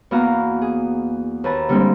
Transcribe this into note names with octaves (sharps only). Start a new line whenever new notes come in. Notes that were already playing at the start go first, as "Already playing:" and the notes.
E2 A#3 B3 F#4 F5 A#5
G#4
D#2 B4 A5 A#5
D3 G3 G#3 A#3 C4